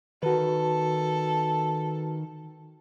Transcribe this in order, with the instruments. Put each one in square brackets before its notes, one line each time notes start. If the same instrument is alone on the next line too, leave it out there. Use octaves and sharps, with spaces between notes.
[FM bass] D#3 [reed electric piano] F#4 B4 [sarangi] A4